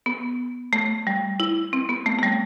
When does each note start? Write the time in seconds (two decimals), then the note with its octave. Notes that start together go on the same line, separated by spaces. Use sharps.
0.06 B3
0.73 A3
1.07 G3
1.40 E4
1.73 C4
1.89 B3
2.06 A3
2.19 A3
2.23 G3